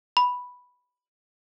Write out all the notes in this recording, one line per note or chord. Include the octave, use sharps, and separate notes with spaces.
B5